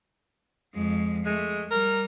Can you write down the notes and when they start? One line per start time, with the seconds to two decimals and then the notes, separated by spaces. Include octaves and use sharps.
0.74 F2 G#3
1.26 G#3 A3
1.70 G3 A#4